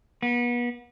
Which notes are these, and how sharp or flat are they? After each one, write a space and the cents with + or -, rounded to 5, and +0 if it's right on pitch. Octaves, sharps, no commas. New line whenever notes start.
B3 -35